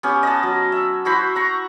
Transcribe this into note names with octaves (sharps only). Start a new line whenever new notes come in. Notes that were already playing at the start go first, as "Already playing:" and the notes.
B3 C#4 G4
D#5 F#5 A5
F#3
E5
E4 F#4 C5 B5
F#5 A#5 C#6